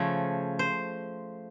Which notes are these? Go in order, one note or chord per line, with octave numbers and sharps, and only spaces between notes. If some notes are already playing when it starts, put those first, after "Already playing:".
Already playing: C#3 F3 A3 C#5
C5